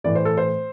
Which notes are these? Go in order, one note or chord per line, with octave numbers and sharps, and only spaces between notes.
A2 E3 A3 D5
C5
A4
C5